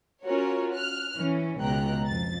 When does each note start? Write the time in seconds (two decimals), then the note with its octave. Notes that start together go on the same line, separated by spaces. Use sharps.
0.25 C#4 F4 F#4 A#4 C#5
0.74 F6 F#6
1.18 E3 C#4
1.60 C#2 B2 G5 A#5 F#6
2.07 F2 A6